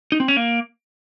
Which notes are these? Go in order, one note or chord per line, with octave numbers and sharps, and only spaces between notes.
D#4
C4
C#4
A#3